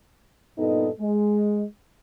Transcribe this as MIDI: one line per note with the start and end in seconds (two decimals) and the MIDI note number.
0.58 0.89 43
0.58 0.89 46
0.58 0.89 59
0.58 0.89 63
0.58 0.89 69
0.58 0.89 75
1.00 1.64 56